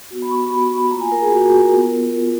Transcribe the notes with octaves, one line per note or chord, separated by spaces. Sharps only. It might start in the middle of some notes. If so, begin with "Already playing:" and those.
B3 F#4
B5
C#6
B5
B3 F#4 B5
C#6
B5
A#3 F4 A#5
G#5
A#4
G#4
A#3 F4 F#4
G#4
A#4
B3 F4
B3 F4